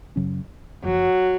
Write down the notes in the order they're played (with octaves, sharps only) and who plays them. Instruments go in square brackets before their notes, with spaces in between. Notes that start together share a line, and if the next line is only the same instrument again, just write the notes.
[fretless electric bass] F#2 C#3 F#3 C#4
[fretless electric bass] F#1 F#2 F3 [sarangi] F#3